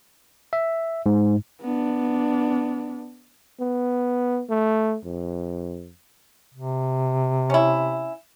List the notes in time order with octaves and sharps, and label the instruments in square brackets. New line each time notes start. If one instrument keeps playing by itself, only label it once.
[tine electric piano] E5
G#2
[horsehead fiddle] B3 D4
[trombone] B3
A3
F2
[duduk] C3
[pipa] C#4 E4